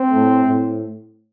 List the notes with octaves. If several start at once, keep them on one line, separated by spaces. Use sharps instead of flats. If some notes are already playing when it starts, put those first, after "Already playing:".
Already playing: C4
A2 A3
A2